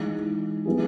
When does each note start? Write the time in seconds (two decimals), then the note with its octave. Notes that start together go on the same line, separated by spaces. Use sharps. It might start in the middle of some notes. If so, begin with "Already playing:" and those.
Already playing: E3 G#3 D#4 G#4
0.65 G3 B3 E4 G#4